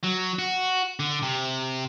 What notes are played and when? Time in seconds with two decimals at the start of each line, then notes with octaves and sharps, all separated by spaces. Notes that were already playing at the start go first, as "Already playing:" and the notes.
0.03 F#3
0.39 F#4
1.00 D3
1.23 C3